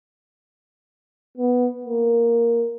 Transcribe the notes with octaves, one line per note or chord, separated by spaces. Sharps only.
B3
A#3